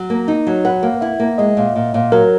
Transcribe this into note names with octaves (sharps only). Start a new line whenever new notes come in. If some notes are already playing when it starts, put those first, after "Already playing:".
Already playing: F#3
A#3
D#4
F#3
B4 F#5
A#3
E4 E5
A#3
G#3 D#5
A#2
A#2
A#2
F#3 A#4